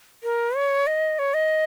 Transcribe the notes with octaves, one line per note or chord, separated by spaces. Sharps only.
A#4
C#5
D#5
C#5
D#5